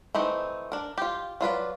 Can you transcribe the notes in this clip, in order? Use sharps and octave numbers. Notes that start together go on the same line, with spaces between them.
E3 A3 C4 D#4
D4 A#4
F4 G4
F#3 F4 B4 D5